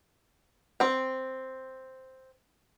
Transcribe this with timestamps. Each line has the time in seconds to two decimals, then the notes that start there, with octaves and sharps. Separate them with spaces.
0.80 C4 G5